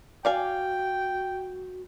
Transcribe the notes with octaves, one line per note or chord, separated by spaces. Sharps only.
F#4 D5 F5 G5 G#5